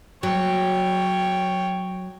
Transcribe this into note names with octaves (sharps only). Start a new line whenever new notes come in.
F#3 C#5 G5